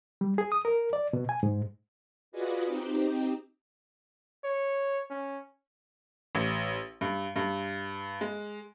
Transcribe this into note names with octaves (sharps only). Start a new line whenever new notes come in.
G3
G#4
D#6
A#4
D5
B2
G#5
G#2
F4 F#4 G#4 B4 D5 D#5
C4 D#4 G4
C#5
C#4
A1
G2
G2
G#3